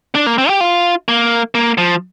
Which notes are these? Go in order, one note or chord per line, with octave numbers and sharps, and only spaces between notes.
D4
A#3
C4
G4
F4
A#3
A#3
F3